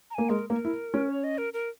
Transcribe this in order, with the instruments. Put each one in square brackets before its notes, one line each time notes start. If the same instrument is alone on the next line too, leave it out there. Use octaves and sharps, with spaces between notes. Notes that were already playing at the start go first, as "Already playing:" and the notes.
[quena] A#5
[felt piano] A#3 [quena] G#5
[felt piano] G#3 [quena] A#4
[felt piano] A#3 [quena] A#4
[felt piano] E4
C#4
[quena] C#5
D#5
A#4
A#4